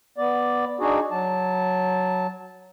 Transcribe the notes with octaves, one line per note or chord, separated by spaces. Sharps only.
B3 D5
D4 D#4 F#4 G#4
F#3 A5